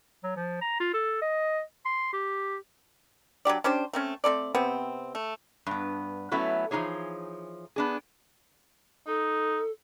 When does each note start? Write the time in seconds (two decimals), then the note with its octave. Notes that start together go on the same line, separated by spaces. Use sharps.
0.23 F#3
0.36 F3
0.61 A#5
0.80 F4
0.94 A4
1.21 D#5
1.85 C6
2.13 G4
3.45 F#3 D4 G4 D5
3.64 C#4 D4 G4 C5
3.93 A3 C4 C#4
4.24 A3 C4 A4 D5
4.55 C3 B3 C4
5.15 A3
5.66 G2 B3
6.31 F#3 A3 B3 C#4 E4 F#4
6.71 E3 F3 G3 D#4 G#4 C#5
7.76 B3 D4 G#4
9.07 D#4 A4